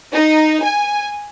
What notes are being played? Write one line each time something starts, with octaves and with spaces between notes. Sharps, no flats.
D#4
G#5